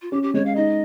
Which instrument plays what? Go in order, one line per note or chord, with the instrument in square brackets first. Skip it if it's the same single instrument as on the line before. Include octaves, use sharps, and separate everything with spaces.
[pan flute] F4
[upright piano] C#4 [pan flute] G4
[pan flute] G4
[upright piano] G#3 [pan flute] C#5
[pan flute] F5
[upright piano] D#4 [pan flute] D#5